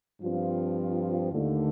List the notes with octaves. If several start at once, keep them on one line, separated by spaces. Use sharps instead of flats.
G2 F3 C4 F4
D#2 D3 A3